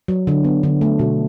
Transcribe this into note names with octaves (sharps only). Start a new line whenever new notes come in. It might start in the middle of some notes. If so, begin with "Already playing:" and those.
F#3
D3
B3
D3
A3
B2